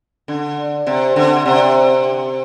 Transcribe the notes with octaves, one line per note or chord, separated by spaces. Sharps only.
D3
C3
D3
C3